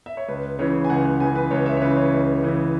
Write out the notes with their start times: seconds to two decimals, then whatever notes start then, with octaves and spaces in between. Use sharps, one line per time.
0.06 E5
0.17 C#5
0.28 C#2 B4
0.59 C#3 E3 C#5
0.84 G#5
0.90 C#2 F#5
1.05 F#5
1.20 C#3 E3 G#5
1.35 B4
1.51 C#2 C#5
1.66 E5
1.77 C#5
1.81 C#3 E3 B4
1.97 C#5
2.12 C#2
2.43 C#3 E3